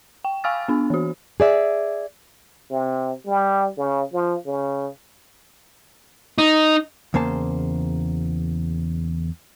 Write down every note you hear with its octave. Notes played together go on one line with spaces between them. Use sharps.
G5
F5 G#5 C#6 E6 F6 A6
B3 D4
E3 F#4
G#4 D5 E5
C3
G3
C#3
F3
C#3
D#4
E2 C#3 A#3 C5 A5